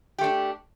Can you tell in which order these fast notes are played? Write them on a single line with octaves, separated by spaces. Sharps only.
G4 A3 D4